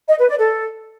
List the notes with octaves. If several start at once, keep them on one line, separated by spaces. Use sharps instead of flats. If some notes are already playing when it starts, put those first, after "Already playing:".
D#5
B4
D5
A4